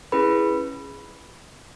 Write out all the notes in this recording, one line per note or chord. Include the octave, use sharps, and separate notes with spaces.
C#4 E4 G#4 B4 B5